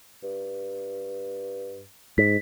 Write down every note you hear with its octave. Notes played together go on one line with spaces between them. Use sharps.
G2
G#2 B6